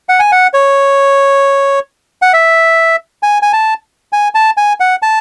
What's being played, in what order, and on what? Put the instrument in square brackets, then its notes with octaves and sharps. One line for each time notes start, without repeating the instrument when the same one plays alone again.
[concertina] F#5
G#5
F#5
C#5
F#5
E5
G#5
G#5
A5
G#5
A5
G#5
F#5
A5